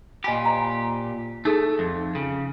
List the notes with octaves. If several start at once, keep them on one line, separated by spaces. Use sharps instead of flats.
A#2 G4 D#5 G#5 B5
C5 D#5 A#5
A3 D#4 G#4 A4
F2
C#3